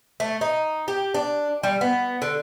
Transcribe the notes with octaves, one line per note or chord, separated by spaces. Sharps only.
A3
D#4
G4
D4
G3
B3
D3